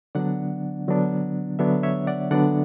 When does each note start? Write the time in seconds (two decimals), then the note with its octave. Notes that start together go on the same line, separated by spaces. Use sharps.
0.15 D3 F#3 B3 D4 D5 F#5
0.88 D3 F#3 B3 D4
1.59 D3 F#3 B3 D4 C#5 E5
1.83 C#5 E5
2.07 D5 F#5
2.31 D3 F#3 B3 D4 D5 F#5